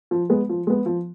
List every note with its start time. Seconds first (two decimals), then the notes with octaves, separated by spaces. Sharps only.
0.11 F3
0.30 G#3 B3
0.49 F3
0.67 G#3 B3
0.86 F3